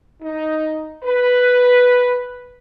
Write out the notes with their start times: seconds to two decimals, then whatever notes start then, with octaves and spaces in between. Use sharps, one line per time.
0.22 D#4
1.04 B4